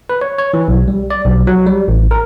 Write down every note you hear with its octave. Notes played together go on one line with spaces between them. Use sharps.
B4
C#5
C#5
E3
B1
G3
D5
B1
F#3
G3
A1
A#4